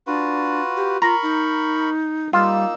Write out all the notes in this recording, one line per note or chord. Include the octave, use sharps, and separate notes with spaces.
D4 F4 F#4 B4
G4
F4 A#4 A#5 B5 C#6
D#4
G3 A#3 D#4 F4 E6